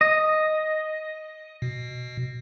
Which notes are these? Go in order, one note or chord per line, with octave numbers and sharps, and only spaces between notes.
D#5
B2